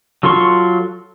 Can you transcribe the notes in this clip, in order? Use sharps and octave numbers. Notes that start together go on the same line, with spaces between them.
F#3 F4 A4 C6 C#6